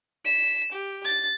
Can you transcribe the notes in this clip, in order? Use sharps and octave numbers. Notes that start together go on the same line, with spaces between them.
B6 E7
G4
A6